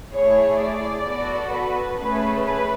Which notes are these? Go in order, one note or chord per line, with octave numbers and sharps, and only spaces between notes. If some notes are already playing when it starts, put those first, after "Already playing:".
A3 E4 G#4 C#5
D5
B3 F#4 A4
B4
A3 C#4 G#4 B4
B4